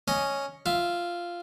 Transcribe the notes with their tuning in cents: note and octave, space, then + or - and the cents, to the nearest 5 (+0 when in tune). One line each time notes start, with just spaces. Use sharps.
C#4 +0 D#5 +0
F4 -5 E5 +0